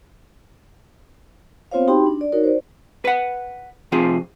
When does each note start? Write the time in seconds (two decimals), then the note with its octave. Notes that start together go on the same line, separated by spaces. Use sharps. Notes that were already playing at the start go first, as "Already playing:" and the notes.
1.71 B3 C4 F4 C5 C#5 F5
1.88 D#4 F#4 G4 G5 B5 C6
2.06 D4
2.21 D5
2.32 D#4 F#4 A#4 C#5
2.44 C5 D5
3.05 B4 F#5
3.92 C3 F3 C4 F4 G#4